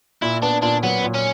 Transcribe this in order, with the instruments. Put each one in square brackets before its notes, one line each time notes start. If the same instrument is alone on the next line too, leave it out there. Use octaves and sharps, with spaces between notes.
[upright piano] A#2 [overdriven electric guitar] E4
[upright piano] B3 [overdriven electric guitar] D4
[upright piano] A#2 [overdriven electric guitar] D4
[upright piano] F#3 [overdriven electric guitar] B3
[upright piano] A#2
[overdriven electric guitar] C#4